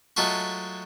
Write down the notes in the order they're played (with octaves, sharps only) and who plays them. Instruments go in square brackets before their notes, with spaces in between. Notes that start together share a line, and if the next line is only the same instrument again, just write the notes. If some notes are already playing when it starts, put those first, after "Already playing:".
[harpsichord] F#3 G#3 A3 F4 F#4